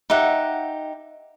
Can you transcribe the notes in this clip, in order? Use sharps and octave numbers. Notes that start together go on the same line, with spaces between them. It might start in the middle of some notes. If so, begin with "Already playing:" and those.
D#4 G4 E5 F#5